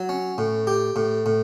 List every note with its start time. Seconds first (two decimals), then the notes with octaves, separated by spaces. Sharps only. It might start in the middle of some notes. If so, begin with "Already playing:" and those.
Already playing: F#3
0.09 C#4
0.38 A2
0.67 G4
0.96 A2
1.26 A2